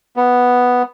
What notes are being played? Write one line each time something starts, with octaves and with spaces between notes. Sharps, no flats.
B3